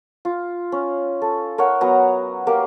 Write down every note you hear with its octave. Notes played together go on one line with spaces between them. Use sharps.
F4
C#4
A4
A#4 C#5 E5 F#5
F#3 B3 A#5
A#3 G4 A#4